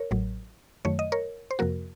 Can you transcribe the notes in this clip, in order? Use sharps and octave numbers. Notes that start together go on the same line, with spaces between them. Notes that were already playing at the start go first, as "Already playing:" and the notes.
Already playing: A#4 C#5
A1 A2 F#3
F#2 D#3 F#3 A3 C#5
D#5
A#4 C#5
C5
F2 C3 F3 A#3 F#4 A#4